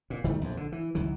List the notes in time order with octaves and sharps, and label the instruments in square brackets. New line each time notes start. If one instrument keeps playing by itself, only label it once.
[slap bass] A#2
G1 D#3 G3 A3
A#1 F2
D3
E3
C#2 F#2 D#3 E3